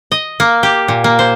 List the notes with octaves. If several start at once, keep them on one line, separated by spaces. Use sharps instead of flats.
D#5
A#3
G4
A#2
A#3
C5